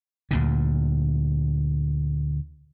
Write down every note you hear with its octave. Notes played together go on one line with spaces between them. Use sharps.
D2 A#2 D3